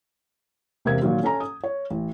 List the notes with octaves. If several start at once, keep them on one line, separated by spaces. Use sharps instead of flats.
E1 C3 G4 A#4 F5 G#6
A#2 D#3 F#3 F4
C#4 A4 G#5 A#5
D#6
C#5
A1